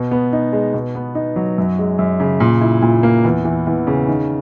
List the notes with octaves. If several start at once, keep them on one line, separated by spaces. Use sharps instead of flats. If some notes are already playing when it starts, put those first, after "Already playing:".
Already playing: B2
B3
D#4
G#3
B2
B3
D#4
F#3
F#2
G#3
F#2
C#3
A#2
E4
A#2
A#3
E2
E3
E2
C#3
D#3